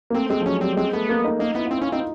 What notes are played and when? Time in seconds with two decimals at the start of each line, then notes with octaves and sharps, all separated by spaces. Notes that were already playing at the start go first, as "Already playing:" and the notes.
0.10 A#3
0.14 A3 C4
0.30 G#3 C4
0.40 F3
0.46 F#3 C#4
0.61 G3 C4
0.77 G#3 C4
0.93 A3 B3
1.09 A#3
1.24 D#4
1.39 A#3 D#4
1.55 B3 E4
1.65 F4
1.71 C4 E4
1.82 C#4 F4
1.92 C4 D#4